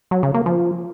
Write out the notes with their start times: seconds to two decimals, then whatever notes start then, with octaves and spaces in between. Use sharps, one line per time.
0.11 F#3
0.23 C#3
0.34 A#3
0.46 F3